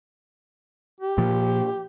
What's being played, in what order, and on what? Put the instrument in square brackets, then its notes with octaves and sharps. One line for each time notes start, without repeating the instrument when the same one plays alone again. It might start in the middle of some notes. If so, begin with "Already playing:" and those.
[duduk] G4
[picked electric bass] A#2 F3